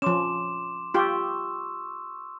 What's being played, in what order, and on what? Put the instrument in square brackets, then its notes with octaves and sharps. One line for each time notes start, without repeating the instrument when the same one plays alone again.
[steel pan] F3 C#4 [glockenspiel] C6 D6 E7
[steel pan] F4 G4 [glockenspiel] C6 C#6 E6